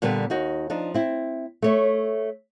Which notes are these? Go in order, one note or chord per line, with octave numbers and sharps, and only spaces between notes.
A#2 D3 G3 B3 G4 B4
D#2 D#4 F#4
F3 D4 D#4
C4 E4
A3 C#5 E5